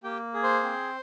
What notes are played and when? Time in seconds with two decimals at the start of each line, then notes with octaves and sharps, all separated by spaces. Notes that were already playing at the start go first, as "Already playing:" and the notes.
0.04 A#3 G4 G5
0.34 G#4
0.43 C5 C6
0.63 C4